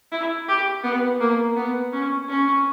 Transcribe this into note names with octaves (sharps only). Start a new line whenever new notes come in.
E4
G4
B3
A#3
B3
C#4
C#4